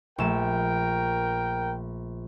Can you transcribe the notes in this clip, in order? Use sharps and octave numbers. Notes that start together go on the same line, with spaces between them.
A#1 A3 A#4 G5 E7